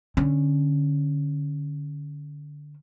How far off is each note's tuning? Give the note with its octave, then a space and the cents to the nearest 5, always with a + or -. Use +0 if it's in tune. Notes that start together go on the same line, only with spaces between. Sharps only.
D3 +0 C#4 -10